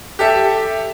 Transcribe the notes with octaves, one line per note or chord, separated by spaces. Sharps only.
G4 A4 E5